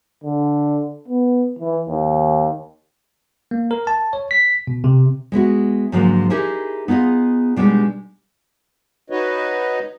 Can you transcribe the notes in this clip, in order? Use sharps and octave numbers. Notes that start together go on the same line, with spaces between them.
D3
B3
E3
D#2
A#3
A#4
A5
C#5
B6
B2
C3
G#3 B3 E4 F#4
G#2 D3 F3 F#3 G#3 A#3
D#4 E4 G4 G#4 A#4 C5
B3 D#4 F4 G#4 D#5
B2 G3 G#3 D4 D#4 G4
D#4 F#4 B4 C#5 D#5